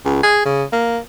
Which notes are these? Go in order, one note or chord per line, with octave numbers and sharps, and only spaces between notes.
C#2
G#4
C#3
A#3